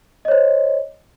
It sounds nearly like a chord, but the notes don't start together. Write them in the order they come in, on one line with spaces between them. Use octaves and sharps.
D#5 C#5 C5